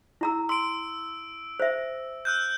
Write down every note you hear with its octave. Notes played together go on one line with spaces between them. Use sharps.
E4 A#5 E6
C6 E6 D7
C5 E5
E6 F#6 G6